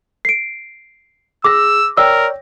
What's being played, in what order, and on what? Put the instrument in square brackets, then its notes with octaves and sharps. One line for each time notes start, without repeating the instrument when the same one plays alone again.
[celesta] C7 D7
[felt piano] G#4 A#6 [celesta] D6 [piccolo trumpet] E6
[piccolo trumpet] A#4 [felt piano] C#5 D5 G5 [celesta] E6